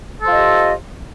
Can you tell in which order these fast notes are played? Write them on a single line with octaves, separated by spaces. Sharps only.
A4 C5 F4 D#5 G4